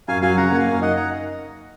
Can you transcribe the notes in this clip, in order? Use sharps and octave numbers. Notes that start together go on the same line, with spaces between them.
F#2 F5 G#5
F#3 F5 G#5
C#3 F#5 A#5
A#3 F#5
F5 G#5
F#2
D#4 D#5 F#5
F#5 A#5